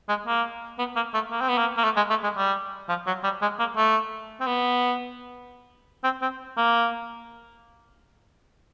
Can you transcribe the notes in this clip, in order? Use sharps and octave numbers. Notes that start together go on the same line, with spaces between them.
G#3
A#3
B3
A#3
A3
A#3
C4
B3
A#3
A#3
A3
G#3
A3
G#3
G3
F3
F#3
G3
G#3
A#3
A3
C4
B3
C4
C4
A#3